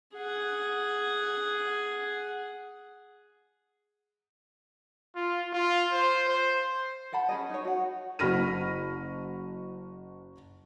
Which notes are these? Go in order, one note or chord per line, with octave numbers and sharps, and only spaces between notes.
G#4 F#5
F4
F4
C5
C5
C5 F#5 A5 B5
C#4 G#4 D#5
D#4 C#5
F#4 F#5
F#1 F#4 B5 F6 A#6 D#7